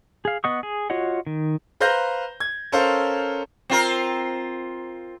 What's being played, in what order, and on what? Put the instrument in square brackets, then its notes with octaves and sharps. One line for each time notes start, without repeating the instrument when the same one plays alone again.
[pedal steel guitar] G#4 F5
B3 D#5 F#5 C#6 D#6
G#4
F4 F#4 C#5 D#5 F#5
D#3
[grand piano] B4 C5 F5 A#5 G6 A#6
G#6
C#4 A4 A#4 C5 F5
[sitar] C4 F4 A#4